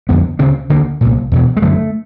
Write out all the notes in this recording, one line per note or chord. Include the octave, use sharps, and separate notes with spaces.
F2 D3 B3
D2 C#3 C4
D2 D3 A#3
C2 A#2
E2 B2
G#3
F#2 D3 A3